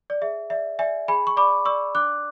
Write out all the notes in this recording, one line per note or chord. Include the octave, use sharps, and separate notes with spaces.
D5
G#4 E5
D5 E5
D5 E5 G#5
G#4 G#5 B5
C#6
D5 B5 D6
D5 C#6 E6
D4 D6 F#6